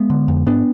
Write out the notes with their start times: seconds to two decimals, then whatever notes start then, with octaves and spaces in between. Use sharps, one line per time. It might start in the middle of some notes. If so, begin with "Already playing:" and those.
Already playing: G#3 B3
0.10 D3
0.28 F2
0.46 G#2 B3 D4